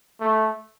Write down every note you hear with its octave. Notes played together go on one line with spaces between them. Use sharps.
A3